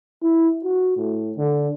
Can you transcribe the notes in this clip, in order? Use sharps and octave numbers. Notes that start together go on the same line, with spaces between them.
E4
F#4
A2
D3